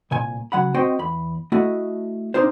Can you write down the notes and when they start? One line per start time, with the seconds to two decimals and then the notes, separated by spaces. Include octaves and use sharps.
0.11 C2 A#2 G#5
0.52 C#3 F#3 F#5 B5
0.74 C4 F#4 C5 D#5 G5
0.99 E2 B5
1.52 A3 E4 F#4 D#5
2.34 C4 D4 D#4 F4 C5